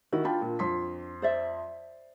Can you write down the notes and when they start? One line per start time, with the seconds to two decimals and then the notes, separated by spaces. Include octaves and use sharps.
0.13 D#3 E4 F#4
0.25 D4 F4 G5 B5
0.42 A#2
0.59 F2 C6 B6
1.22 C5 D5 E5